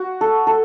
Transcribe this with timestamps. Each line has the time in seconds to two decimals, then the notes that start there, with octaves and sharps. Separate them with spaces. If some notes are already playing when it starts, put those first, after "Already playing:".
Already playing: F#4
0.21 A4
0.47 A4